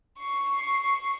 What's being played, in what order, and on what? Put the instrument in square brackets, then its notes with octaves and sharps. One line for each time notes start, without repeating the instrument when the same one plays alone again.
[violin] C#6 C7